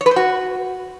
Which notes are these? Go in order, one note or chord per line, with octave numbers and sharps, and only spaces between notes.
C#5
B4
C5
F#4